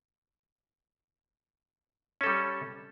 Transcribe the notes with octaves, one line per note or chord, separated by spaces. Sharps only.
G3 C#4 A4